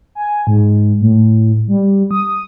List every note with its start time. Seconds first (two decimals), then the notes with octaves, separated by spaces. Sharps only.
0.15 G#5
0.47 G#2
1.01 A2
1.68 G3
2.11 D#6